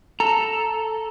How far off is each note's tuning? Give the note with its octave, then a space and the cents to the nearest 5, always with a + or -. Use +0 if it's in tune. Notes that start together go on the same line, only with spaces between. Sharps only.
A4 +0 A#5 +0